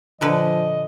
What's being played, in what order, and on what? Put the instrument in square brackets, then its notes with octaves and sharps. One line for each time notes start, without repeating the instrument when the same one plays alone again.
[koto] A#2 D3 B4 [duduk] F3 [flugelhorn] D#5